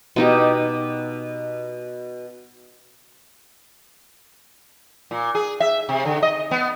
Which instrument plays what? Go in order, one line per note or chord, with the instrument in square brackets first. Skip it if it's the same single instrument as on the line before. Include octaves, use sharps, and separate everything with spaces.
[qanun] B2 D#4 G4
[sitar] A#2
G#4
E5
C3
D3
D#5
B3